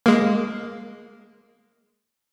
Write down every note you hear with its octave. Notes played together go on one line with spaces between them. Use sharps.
G#3 A#3